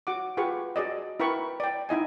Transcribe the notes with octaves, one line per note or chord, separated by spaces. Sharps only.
F#4 F#5 D6
F4 G4 G#4 B4 F#5 C#6
F#4 G#4 D5 D#5
E4 A#4 B4 G5 B5 C#6
D5 G5
D#4 E4 D#5 G#5